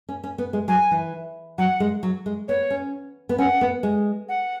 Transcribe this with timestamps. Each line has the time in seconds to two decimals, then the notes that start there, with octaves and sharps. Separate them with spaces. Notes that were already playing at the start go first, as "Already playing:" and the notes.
0.09 C#4
0.24 C#4
0.38 B3
0.53 G#3
0.68 F#3 G#5
0.91 E3
1.58 F#3 F#5
1.80 G#3
2.03 F#3
2.26 G#3
2.48 B3 C#5
2.70 C#4
3.29 B3
3.38 C#4 F#5
3.61 B3
3.83 G#3
4.29 F#5